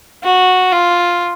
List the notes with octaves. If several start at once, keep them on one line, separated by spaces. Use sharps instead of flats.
F#4
F4